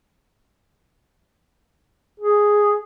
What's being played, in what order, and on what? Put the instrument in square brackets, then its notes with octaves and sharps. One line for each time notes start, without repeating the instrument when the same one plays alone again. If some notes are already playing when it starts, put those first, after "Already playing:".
[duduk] G#4